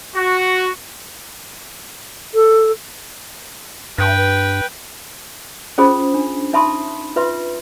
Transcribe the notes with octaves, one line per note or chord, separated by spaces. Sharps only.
F#4
A4
G2 B4 G5
C#4 F4 G#4 C5 B5 D#6
D4
D#4 E5 A5 B5 C6 D#6
F4 B4 E5 C6